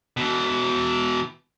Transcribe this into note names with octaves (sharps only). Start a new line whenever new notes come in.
B2 E3